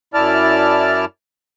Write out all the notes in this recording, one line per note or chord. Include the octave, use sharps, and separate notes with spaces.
F#2 E4 D5 A5 F6